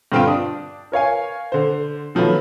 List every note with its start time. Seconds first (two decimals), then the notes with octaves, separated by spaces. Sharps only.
0.12 G2 D3 C4 F4 G5 D7
0.27 D4 D#6
0.92 A#4 C#5 F5 G#5
1.52 D3 C5
2.15 D#3 F3 F#3 A3 B3